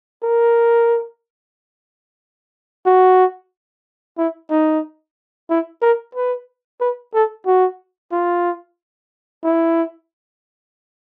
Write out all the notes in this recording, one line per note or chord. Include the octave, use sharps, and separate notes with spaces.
A#4
F#4
E4
D#4
E4
A#4
B4
B4
A4
F#4
F4
E4